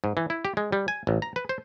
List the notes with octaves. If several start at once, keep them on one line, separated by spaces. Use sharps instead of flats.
G#2
E3
E4
G4
G#3
G3
G#5
A1
A#5
B4
C5